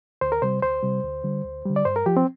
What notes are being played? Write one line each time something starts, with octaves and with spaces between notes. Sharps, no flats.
D2 C5
A#4
C3 G3 C5
D2 C5
C3 G3
D2
D3 G3
D2
D3 G3
D5
G2 C5
A#4
F3 G4
C4